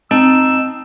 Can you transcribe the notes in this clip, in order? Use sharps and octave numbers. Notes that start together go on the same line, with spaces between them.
C4 D#4 A5 E6